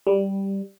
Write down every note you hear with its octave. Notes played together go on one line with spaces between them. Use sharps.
G3